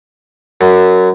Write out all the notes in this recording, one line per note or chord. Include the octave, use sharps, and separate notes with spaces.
F#2